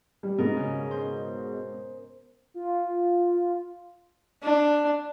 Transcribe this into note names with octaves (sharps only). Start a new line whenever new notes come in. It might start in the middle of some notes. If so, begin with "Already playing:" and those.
G3
G#2 B2 B3 A#4 D#5
C#3
C5
F4
D4